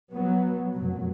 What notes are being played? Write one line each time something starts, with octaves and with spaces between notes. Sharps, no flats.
F#3 B3
F1 F#2 B2 F#3